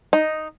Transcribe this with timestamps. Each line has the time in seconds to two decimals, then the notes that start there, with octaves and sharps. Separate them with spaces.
0.13 D#4